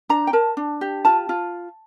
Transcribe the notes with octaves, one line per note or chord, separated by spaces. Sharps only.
D4 A#5
G5
A#4 A5
D4
G4
F4 A5
F4